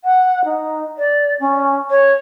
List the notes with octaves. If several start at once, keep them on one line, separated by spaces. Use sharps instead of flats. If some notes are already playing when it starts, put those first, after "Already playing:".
F#5
D#4
D5
C#4
C#5